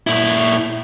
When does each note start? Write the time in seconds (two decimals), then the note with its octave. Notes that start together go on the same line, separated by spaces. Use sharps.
0.07 A#2 E4